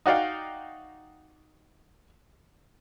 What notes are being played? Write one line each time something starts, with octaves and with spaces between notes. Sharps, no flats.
D#4 F#4 D5 F5 G5